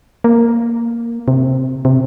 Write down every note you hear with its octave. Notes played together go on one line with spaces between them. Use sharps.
A#3
C3
C3